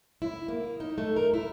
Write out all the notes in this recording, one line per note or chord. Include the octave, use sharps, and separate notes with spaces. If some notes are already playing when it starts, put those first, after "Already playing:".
E4
A#3
D#4
A3
A#4
E4